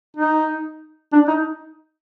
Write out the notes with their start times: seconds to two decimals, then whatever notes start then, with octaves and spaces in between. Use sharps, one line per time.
0.17 D#4
1.12 D4
1.28 D#4